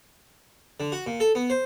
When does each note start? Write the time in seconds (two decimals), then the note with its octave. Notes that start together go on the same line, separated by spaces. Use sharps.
0.80 D3
0.92 F#4
1.06 A#2
1.20 A4
1.35 B3
1.50 C5